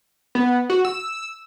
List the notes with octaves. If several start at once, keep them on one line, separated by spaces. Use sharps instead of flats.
B3
F#4
E6